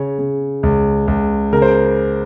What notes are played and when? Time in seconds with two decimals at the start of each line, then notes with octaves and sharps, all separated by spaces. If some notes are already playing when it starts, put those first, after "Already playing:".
Already playing: C#3 C#5
0.19 C#3
0.63 C#2
1.08 C#2
1.53 C#3 A#4
1.62 C5